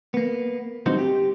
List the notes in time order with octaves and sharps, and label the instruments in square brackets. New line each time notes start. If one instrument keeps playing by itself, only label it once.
[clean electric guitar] A#3 B3
G3 C4 D#4 F4 F#4 C5
G4